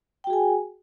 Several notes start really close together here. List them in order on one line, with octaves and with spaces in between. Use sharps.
G5 F#4 G#4 G#5